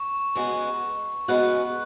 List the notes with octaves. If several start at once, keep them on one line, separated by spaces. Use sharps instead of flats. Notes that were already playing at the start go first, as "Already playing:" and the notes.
Already playing: C#6
C#3 G#3 B3 F#4
C#3 G#3 B3 F#4 F#6